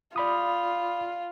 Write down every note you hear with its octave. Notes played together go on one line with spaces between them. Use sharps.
F4 D5 B5 D#6